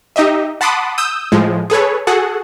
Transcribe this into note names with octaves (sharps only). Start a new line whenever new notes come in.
D#4 G4 D#5 E5
F#5 A5 B5 C6 D6 D#6
D#6 E6 G6
A2 F3 G#3
G#4 A4 B4 C#5
F#4 G#4 A4 F#5